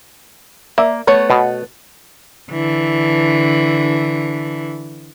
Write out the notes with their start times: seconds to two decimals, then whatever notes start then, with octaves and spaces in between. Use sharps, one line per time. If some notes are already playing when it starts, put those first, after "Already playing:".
0.78 A#3 D5 E5
1.07 A3 B3 C#5
1.30 B2
2.52 D3 E3